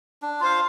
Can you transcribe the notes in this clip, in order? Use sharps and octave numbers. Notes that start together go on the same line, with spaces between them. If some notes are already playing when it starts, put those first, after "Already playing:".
D4
F4 C5 F5